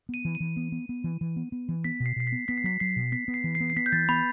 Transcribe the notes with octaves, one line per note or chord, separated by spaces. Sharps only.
B3 D#7
E3
D#7
E3
B3
B3
B3
E3
E3
B3
B3
E3
B3 B6
B2
C7
B2 C7
B6
B3
B3 B6
C7
F#3 B6
F#3 C7
B2
B3 B6
B3
C7
E3
C7
B3
C7
B3 B6
G6
E3 A6
B3 B5